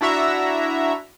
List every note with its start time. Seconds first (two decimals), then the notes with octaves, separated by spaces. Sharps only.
0.01 D4 E4 F#4 E5 A#5